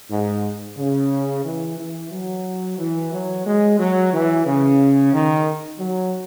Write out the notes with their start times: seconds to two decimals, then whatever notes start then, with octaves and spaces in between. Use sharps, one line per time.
0.11 G#2
0.78 C#3
1.45 E3
1.78 E3
2.12 F#3
2.79 E3
3.12 F#3
3.45 G#3
3.79 F#3
4.12 E3
4.46 C#3
5.13 D#3
5.80 F#3